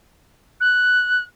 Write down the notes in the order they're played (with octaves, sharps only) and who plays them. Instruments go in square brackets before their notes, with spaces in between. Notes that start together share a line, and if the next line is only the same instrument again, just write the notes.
[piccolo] F#6